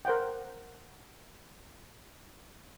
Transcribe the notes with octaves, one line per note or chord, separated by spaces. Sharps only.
A#4 C5 F#5 G5